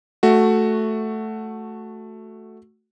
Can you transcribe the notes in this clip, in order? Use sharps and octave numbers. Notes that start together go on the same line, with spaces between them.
A3 F#4